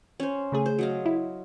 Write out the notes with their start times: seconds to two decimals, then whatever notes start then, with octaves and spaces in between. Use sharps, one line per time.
0.20 C#4 C5
0.52 C#3 A3 G#4
0.66 C5
0.79 F#3 D#5 F5
1.06 E4